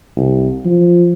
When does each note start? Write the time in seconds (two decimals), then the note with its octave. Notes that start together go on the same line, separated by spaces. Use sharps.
0.16 C2
0.65 F3